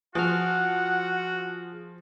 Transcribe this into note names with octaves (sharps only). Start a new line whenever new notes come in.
F3 F#4 G#4 F#5 F6